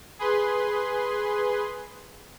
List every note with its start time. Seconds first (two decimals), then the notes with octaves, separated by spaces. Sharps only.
0.19 G#4 B4 C6